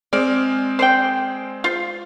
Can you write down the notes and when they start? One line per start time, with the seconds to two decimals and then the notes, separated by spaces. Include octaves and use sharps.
0.13 G#3 C4 D5 F6
0.79 C5 D5 G5
1.64 F4 C5